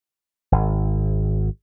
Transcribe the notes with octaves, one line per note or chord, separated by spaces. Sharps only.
G#1